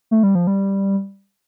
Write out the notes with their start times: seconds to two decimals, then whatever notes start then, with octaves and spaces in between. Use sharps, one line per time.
0.11 A3
0.23 G3
0.35 F3
0.47 G3